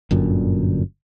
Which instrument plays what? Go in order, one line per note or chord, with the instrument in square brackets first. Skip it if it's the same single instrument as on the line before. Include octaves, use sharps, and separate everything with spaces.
[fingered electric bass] G1 F#2 A#2 D3